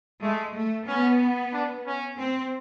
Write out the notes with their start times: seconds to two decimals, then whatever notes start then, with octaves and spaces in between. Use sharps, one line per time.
0.22 G#3 A3
0.55 A3
0.88 B3 C#4
1.53 D4
1.86 C#4
2.19 C4